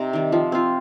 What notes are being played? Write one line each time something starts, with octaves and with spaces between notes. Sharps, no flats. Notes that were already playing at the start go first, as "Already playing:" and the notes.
Already playing: C3 D#4 A#5
D#3 G3
F3
C4 F4